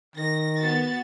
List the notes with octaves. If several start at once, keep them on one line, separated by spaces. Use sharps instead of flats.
D#3 A#6
B3 F#4 A6